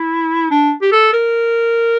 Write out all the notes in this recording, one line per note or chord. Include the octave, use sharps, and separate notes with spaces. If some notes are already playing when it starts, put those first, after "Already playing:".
Already playing: E4
D4
G4
A4
A#4